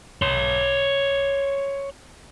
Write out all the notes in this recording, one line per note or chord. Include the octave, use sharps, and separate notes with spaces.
C#5 C6